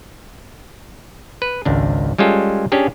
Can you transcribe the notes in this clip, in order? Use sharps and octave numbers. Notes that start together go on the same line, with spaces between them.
B4
G#1 C#2 D4
G3 G#3 C#4 F4 A4
C#4 D4 G4 G#4